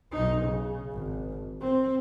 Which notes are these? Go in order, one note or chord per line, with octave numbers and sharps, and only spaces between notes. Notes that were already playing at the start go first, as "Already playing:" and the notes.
B1 D#4
C#3
G#1
C4